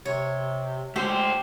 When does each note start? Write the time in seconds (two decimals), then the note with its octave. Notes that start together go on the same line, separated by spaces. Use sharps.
0.05 C3 C#5
0.96 G#3 A3 G4 C5